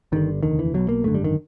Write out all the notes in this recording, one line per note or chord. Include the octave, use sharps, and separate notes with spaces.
G1 G2 D3 D#3
F1 D#2 D3 D#3
E3
B1 B2 F#3
A#3
G#1 F#2 D3 A3
G3
D#3